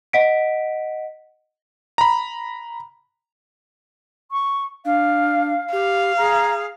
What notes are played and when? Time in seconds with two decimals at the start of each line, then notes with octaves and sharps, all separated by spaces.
0.13 D#5 F#5 B6 D7
1.98 A#5 B5
4.31 C#6
4.85 D4 F5
5.73 G4 F5
6.17 G#4 A#5